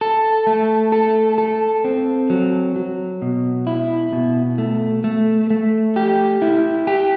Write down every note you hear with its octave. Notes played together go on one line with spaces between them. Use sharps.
A4
A3
A4
A4
C4
F#3
F#3
B2
E4
B2
A3
A3
A3
G4
E4
G4